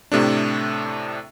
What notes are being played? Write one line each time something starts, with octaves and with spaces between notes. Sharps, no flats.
A2 C3 A3 D4